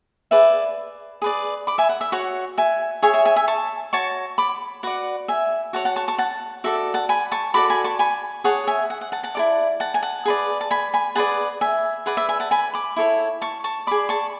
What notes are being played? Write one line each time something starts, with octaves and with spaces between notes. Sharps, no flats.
G#4 B4 D5 E5
G#4 B4 D5
B5 D6
E5 G#5
F#5
E5
F#4 C#5 F#5
E5 G#5
G#4 C#5 E5 G#5
E5 G#5
E5 G#5
E5 G#5
A5 C#6
F#4 C#5 A5 C#6
B5 D6
F#4 B4 D5 F#5
E5 G#5
F#4 C#5 F#5 A5
F#5 A5
A5 C#6
A5 C#6
F#5 A5
F#4 A4 D5 E5
F#5 A5
G#5 B5
A5 C#6
F#4 A4 D5 B5 D6
G#5 B5
A5 C#6
G#5 B5
G#4 C#5 F#5 A5
E5 G#5
F#5
F#5
F#5 A5
F#5 A5
E4 A4 D5
F#5 A5
G#5
F#5 A5
G#4 B4 D5
A5
G#5 B5
G#5 B5
G#4 B4 D5 F#5 A5
E5 G#5
G#4 B4 D5 F#5
E5
E5 G#5
F#5 A5
G#5 B5
B5 D6
E4 A4 C#5
A5 C#6
A5 C#6
G#4 D5 B5 D6
A5 C#6